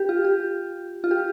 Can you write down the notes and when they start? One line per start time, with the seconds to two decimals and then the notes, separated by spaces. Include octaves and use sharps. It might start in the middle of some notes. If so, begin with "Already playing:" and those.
Already playing: G4
0.09 F4
0.24 G4
1.04 F4
1.11 G4